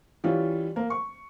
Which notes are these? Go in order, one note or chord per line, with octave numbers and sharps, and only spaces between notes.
E3 G3 C#4 F4
A#3
C#6